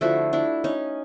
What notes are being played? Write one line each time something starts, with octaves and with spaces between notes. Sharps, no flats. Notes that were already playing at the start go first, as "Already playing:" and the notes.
D3 F3 A3 E4 F#4
D4 E4
C#4 D#4